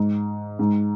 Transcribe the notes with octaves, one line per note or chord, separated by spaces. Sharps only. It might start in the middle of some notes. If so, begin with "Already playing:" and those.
Already playing: G#2
G#2